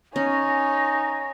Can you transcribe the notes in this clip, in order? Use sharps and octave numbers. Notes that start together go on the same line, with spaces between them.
C#4 D#4 C#5 G#5 A#6